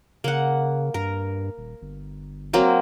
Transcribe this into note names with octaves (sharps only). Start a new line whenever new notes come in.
C#3 A#3 F#5
G2 A#4
D#1
G1
F#3 A#3 C4